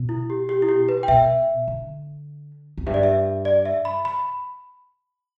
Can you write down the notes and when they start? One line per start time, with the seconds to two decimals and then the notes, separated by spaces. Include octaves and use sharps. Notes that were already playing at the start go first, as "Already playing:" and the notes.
Already playing: B2
0.09 E4
0.30 G4
0.49 G4
0.62 E4
0.69 G4
0.89 B4
1.03 G5
1.08 B2 E5
1.68 D3
2.77 E2
2.86 G2 E5
2.94 D5
3.03 E5
3.45 D5
3.65 E5
3.85 B5
4.05 B5